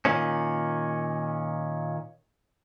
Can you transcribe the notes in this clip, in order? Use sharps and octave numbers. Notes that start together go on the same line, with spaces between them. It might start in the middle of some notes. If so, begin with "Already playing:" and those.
A#2 D#3 C#4